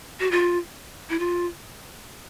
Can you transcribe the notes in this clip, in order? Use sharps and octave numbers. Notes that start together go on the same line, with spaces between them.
F#4
F4
E4
F4